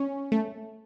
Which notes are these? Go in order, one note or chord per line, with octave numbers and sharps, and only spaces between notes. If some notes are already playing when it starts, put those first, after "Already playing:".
Already playing: C#4
A3